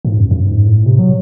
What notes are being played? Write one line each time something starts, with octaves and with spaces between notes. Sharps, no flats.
G#2
F#2
F#2
G#2
A2
C3
F#3